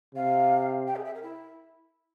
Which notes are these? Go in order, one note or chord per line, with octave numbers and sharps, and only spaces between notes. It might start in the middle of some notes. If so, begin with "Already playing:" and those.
C3 F5
G5
G#4
E5
A#4
E4